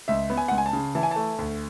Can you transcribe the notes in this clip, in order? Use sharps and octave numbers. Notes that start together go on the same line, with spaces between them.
C#2 E5
B3
G#5
C#2 F#5
G#5
A5
C#3
E3 A5
G#5
A3 A5
D2